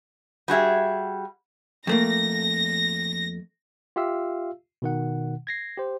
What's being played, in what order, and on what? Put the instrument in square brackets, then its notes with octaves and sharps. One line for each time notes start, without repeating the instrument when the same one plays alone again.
[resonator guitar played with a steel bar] G3 F#4 G#4 E5
[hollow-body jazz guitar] F2 A3 A#3 [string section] A#6
[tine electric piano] F4 G4 E5 F5 E6
B2 D#3 F#5
G#6 A#6 C7
G4 C5